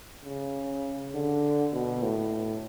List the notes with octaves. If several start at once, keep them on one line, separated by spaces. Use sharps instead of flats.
C#3
D3
B2
A2